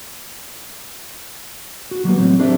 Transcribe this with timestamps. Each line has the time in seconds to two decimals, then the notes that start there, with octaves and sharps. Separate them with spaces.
1.91 F#4
2.05 F#3 G3 A#3 B3
2.18 A2 F#3 C4
2.39 C4 D4 G4 C5 D5 E5